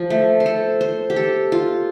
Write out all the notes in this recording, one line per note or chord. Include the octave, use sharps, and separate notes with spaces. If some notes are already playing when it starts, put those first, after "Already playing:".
Already playing: F3
A3
C5
A4
C5
G4
A4
F4